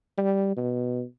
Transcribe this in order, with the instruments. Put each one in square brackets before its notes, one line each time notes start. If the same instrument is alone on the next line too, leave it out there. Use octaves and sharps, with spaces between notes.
[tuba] G3
B2